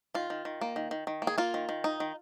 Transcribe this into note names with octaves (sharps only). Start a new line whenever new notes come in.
D#3 F4
D#3
D#3
A#3
D#3
D#3
D#3
A#3
G#4
A#3 F4
D#3
D#3
D#4
D#3